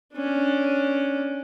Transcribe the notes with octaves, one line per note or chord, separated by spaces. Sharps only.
C#4 D4